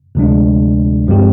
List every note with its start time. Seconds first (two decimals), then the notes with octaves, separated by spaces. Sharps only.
0.15 D2 C3 F3 G#3 D4
1.07 G2 F3 G#3 C4 G4